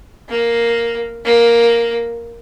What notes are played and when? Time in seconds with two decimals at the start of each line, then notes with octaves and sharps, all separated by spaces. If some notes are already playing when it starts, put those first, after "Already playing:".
0.29 A#3
1.25 A#3